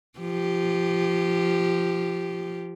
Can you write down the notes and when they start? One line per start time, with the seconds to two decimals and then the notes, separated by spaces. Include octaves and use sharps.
0.19 F3 G4